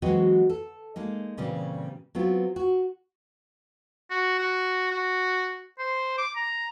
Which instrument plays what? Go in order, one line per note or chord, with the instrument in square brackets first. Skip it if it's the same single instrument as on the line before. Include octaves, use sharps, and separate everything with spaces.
[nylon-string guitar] E3 F#3 G#3 C4 F#4 D#5
A4
G#3 A#3 D#4
A#2 C#3 E3 G3 C4
F#3 B3 C4 F4
F#4
[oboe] F#4
F#4
F#4
C5
D6
A#5